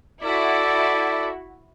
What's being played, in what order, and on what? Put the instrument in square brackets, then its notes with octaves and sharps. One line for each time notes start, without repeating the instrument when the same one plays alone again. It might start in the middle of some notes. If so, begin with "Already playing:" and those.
[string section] E4 F#4 [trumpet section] A4 D5